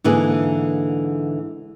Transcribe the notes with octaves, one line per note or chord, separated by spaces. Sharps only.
G#2 D3 E3 A#3 G#4